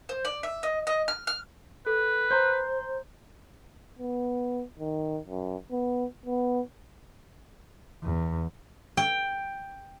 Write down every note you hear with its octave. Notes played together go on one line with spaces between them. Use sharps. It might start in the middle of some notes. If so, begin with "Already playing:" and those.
C5
D5
E5
D#5
D#5
F6
F6
A4 B4
C5 A#5 C6 G6
B3
D#3
F#2
B3
B3
E2
G5